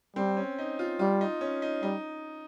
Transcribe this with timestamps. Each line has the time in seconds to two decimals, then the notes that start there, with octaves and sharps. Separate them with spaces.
0.16 G3 C4
0.37 C#4
0.58 D#4
0.79 F4
0.99 G3 F4
1.21 D#4
1.41 C#4
1.62 D#4
1.83 G3 D#4